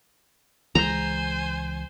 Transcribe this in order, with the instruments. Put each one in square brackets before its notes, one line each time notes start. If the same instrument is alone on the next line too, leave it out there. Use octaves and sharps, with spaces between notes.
[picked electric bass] C#2 E3 G#3 [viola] C5 G#5 [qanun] A#5